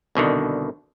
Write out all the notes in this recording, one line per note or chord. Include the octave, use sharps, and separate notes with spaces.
C2 B2 D3 D#3